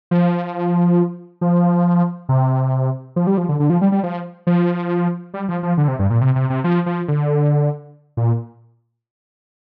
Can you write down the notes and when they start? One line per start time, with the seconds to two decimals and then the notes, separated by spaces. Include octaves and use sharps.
0.11 F3
1.41 F3
2.29 C3
3.16 F3
3.27 G3
3.38 F3
3.49 D3
3.60 D3
3.70 F3
3.81 G3
3.92 G3
4.03 F3
4.47 F3
5.34 G3
5.48 F3
5.63 F3
5.78 D3
5.88 C3
5.99 G2
6.10 A#2
6.21 C3
6.36 C3
6.50 C3
6.64 F3
6.86 F3
7.08 D3
8.17 A#2